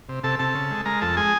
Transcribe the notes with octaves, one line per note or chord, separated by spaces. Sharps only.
C3
C3 A4 A5
C3 A4 A5
C#3
G#3
G#3 A#4 A#5
F2 A4 A5
G#3 G#4 G#5